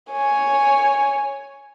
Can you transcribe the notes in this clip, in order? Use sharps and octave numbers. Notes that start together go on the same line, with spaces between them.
C#5 G#5